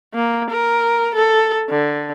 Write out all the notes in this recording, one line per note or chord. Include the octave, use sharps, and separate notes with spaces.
A#3
A#4
A4
D3